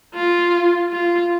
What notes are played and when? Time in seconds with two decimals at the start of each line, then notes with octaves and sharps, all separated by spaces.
0.14 F4
0.92 F4